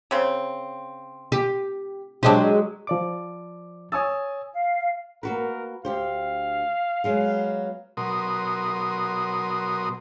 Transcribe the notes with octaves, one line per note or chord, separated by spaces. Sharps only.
C#3 C4
G4
F#3 G#3 D4 G4 C5
F3 D5 D6
C#5 G#5 D#6 E6 A6
F5
A#3 F#4 A#4 B4
D2 G4 C5 F5
F#3 G#3 B3
B2 F#3 A#4 C6 D#6